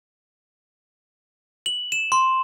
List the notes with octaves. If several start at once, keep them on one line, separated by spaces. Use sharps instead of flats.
F#7
E7
C6